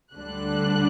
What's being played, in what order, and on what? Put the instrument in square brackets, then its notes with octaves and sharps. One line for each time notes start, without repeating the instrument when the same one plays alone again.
[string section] D2 D3 G3 D4 F#6